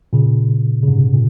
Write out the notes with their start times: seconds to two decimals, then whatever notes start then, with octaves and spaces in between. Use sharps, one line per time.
0.13 A#2 C#3
0.83 C#3
0.88 G#2 C3
1.13 A#2